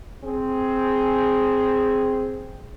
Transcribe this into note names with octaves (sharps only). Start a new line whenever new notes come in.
C4 G#4